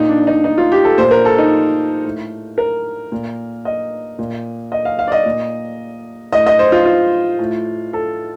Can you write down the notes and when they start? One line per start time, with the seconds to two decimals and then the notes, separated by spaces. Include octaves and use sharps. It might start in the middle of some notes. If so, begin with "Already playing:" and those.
Already playing: A#2 D#4
0.09 D4
0.27 D#4
0.44 D#4
0.58 F4
0.72 G4
0.84 A4
0.98 A#2 C5
1.11 A#4
1.25 A4
1.38 D#4
2.05 A2
2.58 A#4
3.12 A#2
3.65 D#5
4.19 A#2
4.72 D#5
4.85 F5
4.99 F5
5.08 D5
5.12 D#5
5.26 A#2
6.32 A2 D#5
6.47 D#5
6.59 C5
6.72 F4
6.85 F4
7.39 A2
7.93 A4